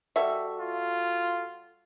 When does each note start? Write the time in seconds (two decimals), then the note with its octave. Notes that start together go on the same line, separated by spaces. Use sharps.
0.16 G3 F#4 A4 E5
0.59 F4